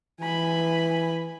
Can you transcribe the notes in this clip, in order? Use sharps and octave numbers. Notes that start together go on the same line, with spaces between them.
E3 G#5 B5